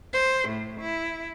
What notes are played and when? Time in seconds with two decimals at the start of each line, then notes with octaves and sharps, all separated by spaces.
0.13 C5
0.49 A2
0.81 E4